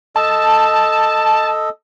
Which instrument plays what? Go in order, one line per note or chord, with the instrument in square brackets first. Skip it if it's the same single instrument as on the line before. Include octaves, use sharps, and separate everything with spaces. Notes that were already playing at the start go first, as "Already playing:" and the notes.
[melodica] A4 D#5 [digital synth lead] A5